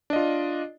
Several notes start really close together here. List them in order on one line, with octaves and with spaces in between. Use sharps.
D4 D#5 F4